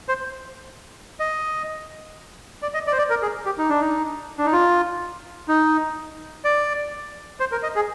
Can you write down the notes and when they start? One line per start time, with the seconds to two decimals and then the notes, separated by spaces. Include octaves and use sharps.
0.09 C5
1.20 D#5
2.62 D5
2.74 D#5
2.87 D5
2.92 C5
2.98 D5
3.10 A#4
3.22 G#4
3.46 G4
3.58 D#4
3.69 D4
3.81 D#4
4.38 D4
4.46 D#4
4.53 F4
5.48 D#4
6.45 D5
7.40 C5
7.52 A#4
7.63 D#5
7.76 G#4